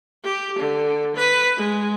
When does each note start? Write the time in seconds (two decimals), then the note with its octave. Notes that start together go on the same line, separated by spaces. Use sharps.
0.24 G4
0.59 D3
1.16 B4
1.57 G#3